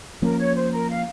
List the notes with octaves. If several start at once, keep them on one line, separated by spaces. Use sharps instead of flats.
F3 A#3 C#4 A#4
C#5
C5
A#4
F5